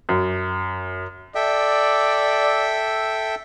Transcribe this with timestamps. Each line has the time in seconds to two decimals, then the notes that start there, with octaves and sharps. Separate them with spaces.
0.09 F#2
1.35 A4 D5 E5 G5